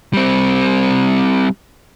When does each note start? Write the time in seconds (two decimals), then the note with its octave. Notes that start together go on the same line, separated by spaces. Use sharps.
0.14 G3 C4